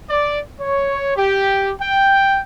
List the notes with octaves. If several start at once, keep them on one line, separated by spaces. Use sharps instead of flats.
D5
C#5
G4
G5